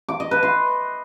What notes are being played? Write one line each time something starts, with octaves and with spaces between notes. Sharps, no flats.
D6
D#5
B4
C6